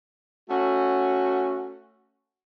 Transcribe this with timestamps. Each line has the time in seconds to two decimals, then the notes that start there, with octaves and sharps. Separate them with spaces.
0.50 A3 C#4 F#4